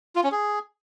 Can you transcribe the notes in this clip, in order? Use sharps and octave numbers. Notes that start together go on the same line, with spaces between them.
F4
C#4
G#4